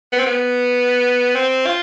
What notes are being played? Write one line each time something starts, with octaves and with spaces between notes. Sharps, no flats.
B3
C4
B3
C4
F4